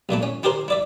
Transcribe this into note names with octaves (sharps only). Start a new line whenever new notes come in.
B1 A#2 A3 E4
C#4
E4 G4 G#4 A#4 C5
E4 D5 E5